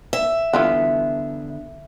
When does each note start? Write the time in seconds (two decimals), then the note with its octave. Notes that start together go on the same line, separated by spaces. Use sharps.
0.13 E5
0.53 D3 E3 B3 F4 F#5